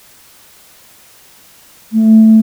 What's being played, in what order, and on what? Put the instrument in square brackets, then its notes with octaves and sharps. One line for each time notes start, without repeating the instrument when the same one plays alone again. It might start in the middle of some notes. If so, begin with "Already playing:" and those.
[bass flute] A3